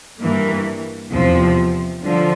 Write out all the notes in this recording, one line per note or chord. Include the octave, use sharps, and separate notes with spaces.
G2 E3 A#3
E2 C3 F3
D3 F3